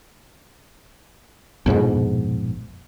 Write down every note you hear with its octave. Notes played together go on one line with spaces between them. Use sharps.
A#1 F2 G#2 B2